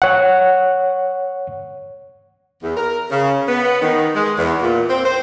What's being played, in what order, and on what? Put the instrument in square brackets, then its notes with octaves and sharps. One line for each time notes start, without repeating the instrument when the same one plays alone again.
[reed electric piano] C#5 F#5
[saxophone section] E2
A#4
C#3
B3
D#3
G#3
E2
A#2
C4
C5